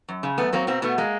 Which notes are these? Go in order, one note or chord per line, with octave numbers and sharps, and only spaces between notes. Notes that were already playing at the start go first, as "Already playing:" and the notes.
F#2
C#3
F#2 A3 B3
F#3 A#3 C4
B2 A#3 C4
B2 A3 B3
G#3 A#3